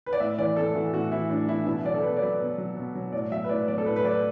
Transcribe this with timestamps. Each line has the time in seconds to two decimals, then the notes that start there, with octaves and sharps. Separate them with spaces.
0.06 B4
0.13 D5
0.20 A2 E5
0.38 E3 D5
0.57 A2 A4
0.75 E3 F#4
0.93 A2 F#4
1.12 E3 E4
1.30 A2 D4
1.48 E3 E4
1.66 B2 E4
1.85 F#3 D5
1.94 A4
2.03 B2 B4
2.17 D5
2.22 F#3 B4
2.40 B2
2.58 F#3
2.77 B2
2.95 F#3
3.12 A2 D5
3.31 F#3 E5
3.44 B4
3.49 A2 D5
3.68 F#3 D5
3.78 A4
3.86 A2 B4
3.96 B4
4.04 F#3 D5